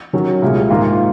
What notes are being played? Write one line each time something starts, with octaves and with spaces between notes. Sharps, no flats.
D#3 F#3 C#4
C2 A#2 G#3
G#2 D#3 A#3 F4 A#4